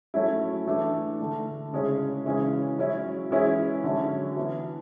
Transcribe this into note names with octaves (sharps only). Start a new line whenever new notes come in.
F#3 A3 C#4 E4
E3 A3 D4
D3 A3 D4
C#3 G#3 C#4 E4
C#3 E3 G#3 C#4 E4
F#3 C#4 E4
E3 G#3 C#4 E4
D3 F#3 C#4 E4
E3 B3 E4